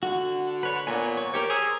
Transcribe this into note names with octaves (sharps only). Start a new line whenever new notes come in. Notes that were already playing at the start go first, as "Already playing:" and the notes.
D3 F#4
B4 C#5
A#2 B3 C#5 G#5
C#5
G4 A#4 C5 C#5
G#4 A#5 C6 E6